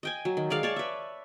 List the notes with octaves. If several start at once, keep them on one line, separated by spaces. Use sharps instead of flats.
D#5 G5 G#5
F#3
D#3
G#3 D5 F5
C#5 D5 A5
B4 E5